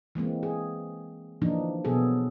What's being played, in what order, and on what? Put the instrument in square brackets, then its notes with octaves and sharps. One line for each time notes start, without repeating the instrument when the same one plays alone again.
[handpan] E3 G#3 A#3 C4
G#4
D3 E3 F3 A#3 D4 D#4
B2 F#3 B3 G#4 A4